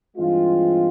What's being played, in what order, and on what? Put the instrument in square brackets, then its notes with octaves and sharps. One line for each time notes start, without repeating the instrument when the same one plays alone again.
[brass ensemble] G2 E3 G#3 C4 F4